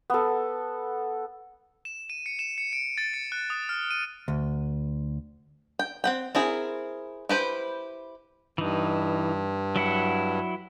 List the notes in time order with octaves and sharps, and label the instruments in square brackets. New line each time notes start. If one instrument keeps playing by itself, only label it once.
[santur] B3 A4
[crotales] E7
D#7
C#7
E7
C#7
D7
A6
C#7
F#6
D#6
F6
D#7
[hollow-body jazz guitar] D2
[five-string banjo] G5
C4 F#5 G5
C4 E4 G#4 A#4
E4 G4 B4 C5
[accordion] G2 [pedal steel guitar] E3 D#4
[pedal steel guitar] F#3 E4 F#5